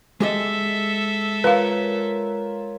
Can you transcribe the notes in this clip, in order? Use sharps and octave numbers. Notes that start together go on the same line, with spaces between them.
G#3 G4 A4 D#5 E5
F4 A#4 B4 C#5 F5